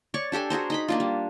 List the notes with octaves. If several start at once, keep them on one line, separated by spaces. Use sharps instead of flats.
C#5 D5 C#6
D4 G4 A4 G#5
F#4 G#4 A#4 C5
D#4 D#5 B5
A#3 D4 F4
G3